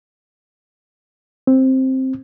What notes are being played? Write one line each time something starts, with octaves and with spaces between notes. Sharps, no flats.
C4